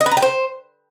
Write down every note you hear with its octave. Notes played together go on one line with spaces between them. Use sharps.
D#5
B4
A#5
G5
C5